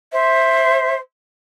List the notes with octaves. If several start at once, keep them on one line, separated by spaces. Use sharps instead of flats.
C5 E5